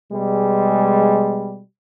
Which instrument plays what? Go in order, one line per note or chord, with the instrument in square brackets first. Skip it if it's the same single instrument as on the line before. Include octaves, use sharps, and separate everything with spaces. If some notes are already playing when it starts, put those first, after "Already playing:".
[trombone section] B2 G3 G#3